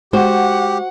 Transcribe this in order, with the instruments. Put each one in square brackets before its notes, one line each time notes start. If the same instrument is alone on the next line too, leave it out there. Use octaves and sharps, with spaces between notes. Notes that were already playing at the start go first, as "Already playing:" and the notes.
[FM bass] G#3 [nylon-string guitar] F#4 C5 [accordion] G4 [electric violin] F#5